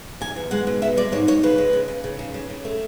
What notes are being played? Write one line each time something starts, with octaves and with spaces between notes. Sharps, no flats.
E2 G#5
E2
G#3 F#5
B2
B3 E5
G#3 D5
G#2 C#5
G#2 C#5
C#3 B4
G#3
C#3
C#3
C#3
C#3
C#3
C#3
A3